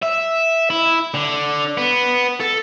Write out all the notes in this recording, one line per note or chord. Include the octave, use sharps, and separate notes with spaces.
E5
E4
D3
B3
A4